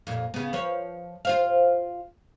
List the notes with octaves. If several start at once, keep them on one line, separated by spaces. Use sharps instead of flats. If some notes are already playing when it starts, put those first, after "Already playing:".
F2 A#2
C#3 B3
F3 B4 C#5
F4 C5 F5